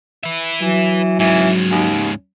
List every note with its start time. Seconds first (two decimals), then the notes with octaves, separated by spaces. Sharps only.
0.23 B4 E5
0.61 E3 F#3
1.19 G#2 E3 C#4
1.71 D#2